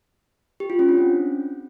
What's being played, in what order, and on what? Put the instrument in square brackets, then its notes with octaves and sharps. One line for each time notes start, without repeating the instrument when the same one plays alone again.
[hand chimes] G4
F4
C#4
D4
C4